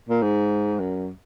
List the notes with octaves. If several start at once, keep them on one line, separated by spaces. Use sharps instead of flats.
A#2
G#2
F#2